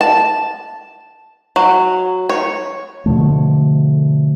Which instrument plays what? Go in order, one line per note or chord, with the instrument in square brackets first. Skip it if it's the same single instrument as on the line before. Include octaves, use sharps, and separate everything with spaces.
[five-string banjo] A5
F#3
C#5
[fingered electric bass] B2 D3 F3 A3